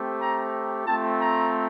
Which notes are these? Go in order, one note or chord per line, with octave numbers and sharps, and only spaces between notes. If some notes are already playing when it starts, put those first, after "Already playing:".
Already playing: A3 C4 G4
A#5
A3 C4 F4 A5
A#5